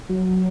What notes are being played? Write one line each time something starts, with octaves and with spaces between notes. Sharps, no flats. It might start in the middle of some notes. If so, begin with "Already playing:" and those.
F#3